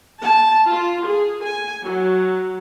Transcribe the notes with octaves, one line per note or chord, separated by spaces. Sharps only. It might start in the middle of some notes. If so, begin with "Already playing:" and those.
A5
F4
G#4
G#5
F#3